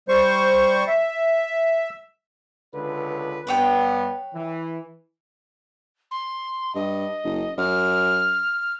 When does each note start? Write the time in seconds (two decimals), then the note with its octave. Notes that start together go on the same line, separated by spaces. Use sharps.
0.09 G3 C5 C#6
0.87 E5
2.74 C#2 D3 B4
3.47 G2 B3 B4 C#5 G5
4.34 E3
6.11 C6
6.75 G2 D#5
7.25 F#1
7.58 F#2 F6